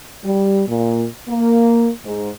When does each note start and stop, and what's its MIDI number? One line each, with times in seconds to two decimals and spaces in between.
0.24 0.62 55
0.68 1.05 46
1.28 1.89 58
2.05 2.31 44